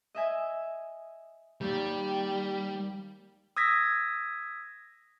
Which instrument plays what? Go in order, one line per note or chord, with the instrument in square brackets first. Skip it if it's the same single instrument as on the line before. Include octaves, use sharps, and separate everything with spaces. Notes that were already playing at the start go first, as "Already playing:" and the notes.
[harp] D#5 E5 G#5
[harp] D#2 [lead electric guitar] G3
[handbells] D#6 E6 G#6 A#6 B6